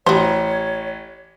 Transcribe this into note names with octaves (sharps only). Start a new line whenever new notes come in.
A1 F#4 C5 C#5